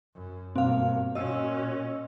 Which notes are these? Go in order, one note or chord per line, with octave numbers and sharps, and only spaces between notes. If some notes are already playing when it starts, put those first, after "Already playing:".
F#2
G2 B2 A#3 C4 F5
A#2 C#4 F#4 D#5 E6